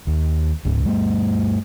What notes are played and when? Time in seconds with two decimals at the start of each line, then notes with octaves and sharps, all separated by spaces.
0.07 D#2
0.65 C#2 G#2
0.84 G2 G3 A3